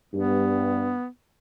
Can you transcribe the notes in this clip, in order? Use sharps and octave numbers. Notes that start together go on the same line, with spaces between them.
G2 B3